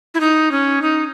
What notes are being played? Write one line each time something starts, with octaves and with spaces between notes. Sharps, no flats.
E4
D#4
C#4
D#4